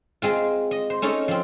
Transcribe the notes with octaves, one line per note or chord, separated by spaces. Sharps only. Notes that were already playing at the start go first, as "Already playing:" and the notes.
G#3 C4 F4
D#5
C5
A3 C#4 D#4 A4
F3 C4